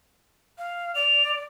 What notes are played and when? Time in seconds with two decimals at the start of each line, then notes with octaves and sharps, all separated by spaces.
0.58 F5
0.95 D5 F7